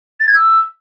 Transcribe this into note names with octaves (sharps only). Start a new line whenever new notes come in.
A6
G#6
E6